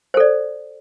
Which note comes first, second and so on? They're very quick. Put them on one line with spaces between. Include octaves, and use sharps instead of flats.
C5 A4 D5